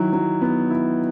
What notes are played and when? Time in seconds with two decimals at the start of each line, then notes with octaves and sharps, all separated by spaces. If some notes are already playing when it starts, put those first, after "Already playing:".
Already playing: D#3 F#3 E4
0.13 F#3
0.42 B3
0.71 E4